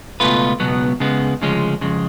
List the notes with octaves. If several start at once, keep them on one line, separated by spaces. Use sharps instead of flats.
C#2 B2 A3 F4 B4
C#2 B2 F#3 B3
C#3 G#3 B3
D2 C#3 F3 G#3 C#4
F2 C#3 G#3